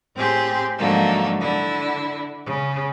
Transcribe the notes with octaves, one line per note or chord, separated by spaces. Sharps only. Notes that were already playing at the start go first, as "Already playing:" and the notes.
A2 C4 G4 G#4 C6
G#2 D3 F3 F#3 A3 A#3
D3 E4
C#3